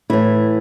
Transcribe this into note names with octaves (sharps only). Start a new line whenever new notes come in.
A2 E3 E4